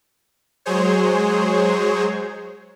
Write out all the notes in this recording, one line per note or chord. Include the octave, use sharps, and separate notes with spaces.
F#3 G#3 G#4 C5 C#5